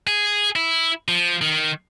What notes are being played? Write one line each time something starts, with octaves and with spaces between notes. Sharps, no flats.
G#4
E4
F3
D#3